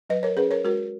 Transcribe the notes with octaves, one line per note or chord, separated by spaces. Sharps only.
F#3 B4 D#5
A#4 C#5
C#4 G#4 B4
A#4 C#5
G#3 F#4 A#4